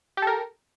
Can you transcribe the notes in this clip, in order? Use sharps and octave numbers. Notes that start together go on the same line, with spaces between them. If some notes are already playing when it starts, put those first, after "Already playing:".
G4 A4 A#4